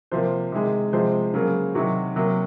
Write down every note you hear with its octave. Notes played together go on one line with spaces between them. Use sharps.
C3 F3 A#3 C5
C3 D#3 G#3
C3 F3 G#3 C5
C#3 F#3 A#3
C3 D#3 F#3 F#4
C3 F#3 A#3